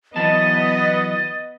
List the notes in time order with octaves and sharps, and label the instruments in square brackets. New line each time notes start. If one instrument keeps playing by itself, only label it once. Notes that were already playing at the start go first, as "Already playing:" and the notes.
[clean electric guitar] E3 F#3 A5 [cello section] B3 [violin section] D#5 [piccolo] A6